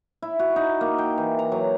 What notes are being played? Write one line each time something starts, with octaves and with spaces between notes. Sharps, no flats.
E4
F#4
D#4
A#3
G5
E3
A#5
F#3